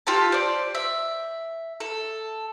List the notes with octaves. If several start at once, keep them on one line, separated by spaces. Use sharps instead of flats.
F4 G4 A4 A5
C5 D5
E5
A4